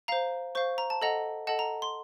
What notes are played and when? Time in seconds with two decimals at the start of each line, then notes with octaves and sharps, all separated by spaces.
0.08 C5 F5 A#5
0.55 C5 F5 C#6
0.78 A#5
0.90 A5
1.02 A4 D#5 F#5 A#5
1.47 A4 D#5 F#5 A5
1.59 A#5
1.82 C6